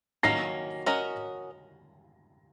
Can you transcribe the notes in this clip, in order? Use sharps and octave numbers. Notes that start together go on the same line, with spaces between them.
D#3 F#3 A#3 C#4 A#6 C7
C#4 F#4 A#4 D#5